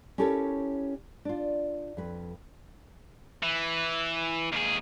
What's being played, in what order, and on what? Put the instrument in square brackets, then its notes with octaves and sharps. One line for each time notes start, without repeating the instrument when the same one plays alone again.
[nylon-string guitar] C#4 E4 G4 A4 A#4 C#5
D4 F4
F2 B4
[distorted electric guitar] E3
D#2 G#4